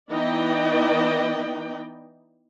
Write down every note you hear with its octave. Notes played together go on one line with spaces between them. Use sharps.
E3 B3 D#4 D5 D#5 G5